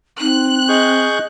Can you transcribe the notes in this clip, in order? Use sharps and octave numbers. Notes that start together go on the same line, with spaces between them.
C4 D#4 F#6
G#4 D#5 C#6 G6